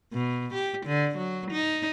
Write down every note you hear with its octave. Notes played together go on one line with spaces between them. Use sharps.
B2
G4
D3
F#3
D#4